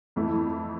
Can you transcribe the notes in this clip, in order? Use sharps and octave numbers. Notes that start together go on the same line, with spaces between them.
F2 E3 A3 E4